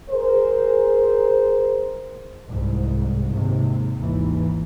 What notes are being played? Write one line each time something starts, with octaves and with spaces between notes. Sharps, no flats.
G#4 A#4 C5
C2 G#2
D#2 G#2 C3
G#1 D#2 E3